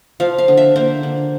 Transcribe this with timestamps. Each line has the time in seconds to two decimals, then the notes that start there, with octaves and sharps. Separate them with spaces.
0.20 F3 F5
0.38 F5
0.48 D3
0.57 E5
0.76 A#3 C5
1.03 D3